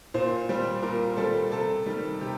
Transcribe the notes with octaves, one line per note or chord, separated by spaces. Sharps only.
A#2 C5
G3 C4
A#2 A#4
G3 C4 A4
C3 A4
D#3 G3
C3 G4